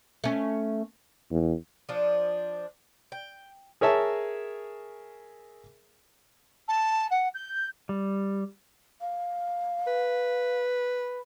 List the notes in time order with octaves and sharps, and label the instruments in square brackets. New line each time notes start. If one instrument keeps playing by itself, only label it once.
[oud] A3 C#4
[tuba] E2
[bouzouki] F3 D4
G5
[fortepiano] G#4 A#4 C#5 E5 A5
[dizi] A5
F#5
G6
[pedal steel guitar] G3
[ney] F5
[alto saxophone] B4